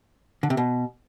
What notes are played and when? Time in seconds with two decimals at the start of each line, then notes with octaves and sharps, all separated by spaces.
0.43 D3
0.50 C3
0.57 B2